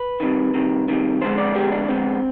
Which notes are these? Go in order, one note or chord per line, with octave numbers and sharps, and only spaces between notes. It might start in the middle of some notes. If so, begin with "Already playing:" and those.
Already playing: B4
C2 C3 D#3
C2 C3 D#3
C2 C3 D#3
F2 D3 G#3 B3 C5
D5
F2 D3 G#3 B3 G4
D4
F2 D3 G#3 B3 C4